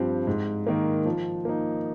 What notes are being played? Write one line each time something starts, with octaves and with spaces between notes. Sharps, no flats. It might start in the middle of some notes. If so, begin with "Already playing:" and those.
Already playing: G2 F3 C4 G4
G#2
D#3 A#3
F3
A#3 D#4